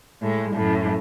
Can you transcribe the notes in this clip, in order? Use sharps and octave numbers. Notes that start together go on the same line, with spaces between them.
A2 G#3
F#2 A2